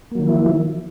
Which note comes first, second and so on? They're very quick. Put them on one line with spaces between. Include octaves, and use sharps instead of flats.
A#3 F#3 D#3 F3 E4